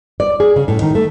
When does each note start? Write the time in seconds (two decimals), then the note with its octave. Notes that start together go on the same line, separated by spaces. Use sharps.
0.20 D5
0.40 G#4
0.56 C#3
0.68 A2
0.82 D#3
0.95 A3